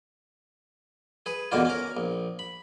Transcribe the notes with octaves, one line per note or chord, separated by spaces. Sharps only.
G#4 B4
E2 B2 D3 A#3 F4
C#4 A#4
A#1
B5